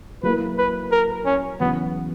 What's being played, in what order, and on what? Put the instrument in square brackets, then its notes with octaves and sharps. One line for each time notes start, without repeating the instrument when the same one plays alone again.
[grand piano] F#3 A#3 E4 A#4 [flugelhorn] B4
[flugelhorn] B4
A#4
C#4
[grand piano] E2 C#3 F#3 [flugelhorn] B3